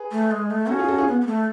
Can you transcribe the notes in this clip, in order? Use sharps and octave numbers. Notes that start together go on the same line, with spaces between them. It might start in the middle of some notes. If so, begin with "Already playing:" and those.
Already playing: G#4 B4
A3
G#3
A3
C#4 F#4 A4
F4 G#4
F#4 A4
F4 G#4
B3
B3
A3